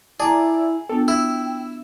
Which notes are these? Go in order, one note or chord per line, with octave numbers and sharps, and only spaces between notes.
E4 G#4 D5 A5 A#5
B3 D4 F4 A4 G5
E4 E6